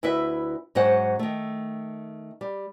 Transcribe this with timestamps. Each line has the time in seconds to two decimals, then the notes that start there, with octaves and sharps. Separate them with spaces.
0.03 D2 E4 B4 E5
0.75 G#2 F#3 C#4 C5 F#5
1.19 D#3 A3
2.41 G3